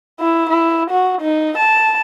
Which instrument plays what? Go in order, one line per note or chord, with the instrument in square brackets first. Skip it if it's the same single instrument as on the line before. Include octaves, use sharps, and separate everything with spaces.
[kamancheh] E4
E4
F#4
D#4
A5